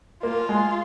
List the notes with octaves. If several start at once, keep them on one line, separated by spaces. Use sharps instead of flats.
A#3 F4
G#3